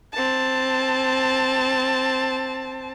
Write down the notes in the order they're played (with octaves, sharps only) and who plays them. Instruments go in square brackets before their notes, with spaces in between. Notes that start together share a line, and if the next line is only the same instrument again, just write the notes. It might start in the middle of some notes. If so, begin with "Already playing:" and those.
[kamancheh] C4 A5